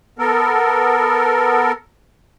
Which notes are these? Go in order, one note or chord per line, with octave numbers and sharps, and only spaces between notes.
B3 A4 A#4